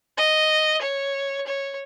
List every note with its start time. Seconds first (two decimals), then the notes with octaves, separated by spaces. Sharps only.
0.17 D#5
0.82 C#5
1.47 C#5